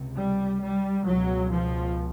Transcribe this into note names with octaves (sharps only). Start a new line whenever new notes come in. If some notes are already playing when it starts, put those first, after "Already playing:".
Already playing: C#2 C3
G3
G3
C#2 B2 F#3
F3